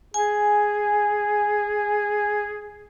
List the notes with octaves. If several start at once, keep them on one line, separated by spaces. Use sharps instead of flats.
G#4 G#5